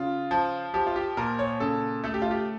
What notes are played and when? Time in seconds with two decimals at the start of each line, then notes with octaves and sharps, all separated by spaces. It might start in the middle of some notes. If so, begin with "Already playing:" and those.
Already playing: C#3 F4
0.31 F3
0.74 F3 G4
0.87 F4
0.96 G4
1.17 A#2 A#4
1.39 C#5
1.60 C#3 A4
2.04 A3 A4
2.14 G4
2.22 F4
2.31 G4